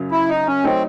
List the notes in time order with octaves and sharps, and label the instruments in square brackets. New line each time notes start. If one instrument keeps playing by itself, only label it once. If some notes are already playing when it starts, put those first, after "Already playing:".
Already playing: [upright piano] F#2 C#3 F#3
[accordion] E4
D#4
C#4
[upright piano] F#3 A3 D#4 A4 C#5 [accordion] C4